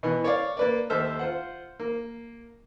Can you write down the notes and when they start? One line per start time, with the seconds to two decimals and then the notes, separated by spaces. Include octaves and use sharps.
0.03 B2 E3 B3
0.24 C#5 D5 F5
0.57 A#3 B4 D5
0.90 D#2 A4 C5 E5 F6
1.19 F4 C5 F#5
1.80 A#3